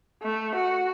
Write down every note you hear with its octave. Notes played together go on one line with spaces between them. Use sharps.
A3
F#4